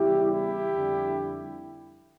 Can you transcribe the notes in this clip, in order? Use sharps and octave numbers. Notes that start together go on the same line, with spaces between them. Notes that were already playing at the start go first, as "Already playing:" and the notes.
Already playing: E2 C#3 G3 E4 G4
E4 G4
F2 D3 G3